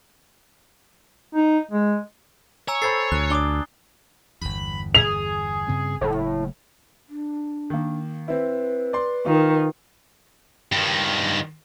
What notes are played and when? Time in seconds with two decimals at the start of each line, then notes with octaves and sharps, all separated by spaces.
1.35 D#4
1.72 G#3
2.68 C#5 G#5 A#5 E6
2.82 A4 C5 B5 G#6 A6 C7
3.12 D2 F#6
3.30 D4 D6 D#6 G7
4.41 G1 E2 B5
4.95 G#4 F7
5.68 G2 C#3 C4
6.01 F#1 A2
7.09 D4
7.70 D#3 A#3
8.28 C4 E4 B4
8.93 D5 C6
9.26 D#3 F4
10.72 G2 D#3